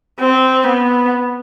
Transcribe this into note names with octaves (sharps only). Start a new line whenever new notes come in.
C4
B3